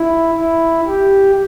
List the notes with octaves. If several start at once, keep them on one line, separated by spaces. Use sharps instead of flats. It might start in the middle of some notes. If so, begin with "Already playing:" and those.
Already playing: E4
E4
G4